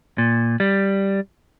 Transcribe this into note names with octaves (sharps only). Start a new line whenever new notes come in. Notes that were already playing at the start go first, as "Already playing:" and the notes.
A#2
G3